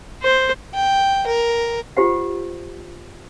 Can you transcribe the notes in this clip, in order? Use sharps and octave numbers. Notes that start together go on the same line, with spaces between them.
C5
G5
A#4
F4 G4 C5 F#5